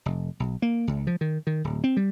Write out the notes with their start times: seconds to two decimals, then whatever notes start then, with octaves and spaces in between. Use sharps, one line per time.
0.06 F1
0.40 B1
0.62 A#3
0.87 C#2
1.07 F3
1.21 D#3
1.47 D#3
1.64 D1
1.84 C4
1.97 G3